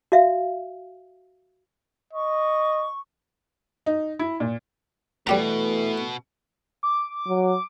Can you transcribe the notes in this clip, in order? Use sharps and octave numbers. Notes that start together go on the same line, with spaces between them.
F#4 E5 F5
D#5 C#6
D#4
E4
A#2
B2 E3 G3 A3 G4 A#5
D6
F#3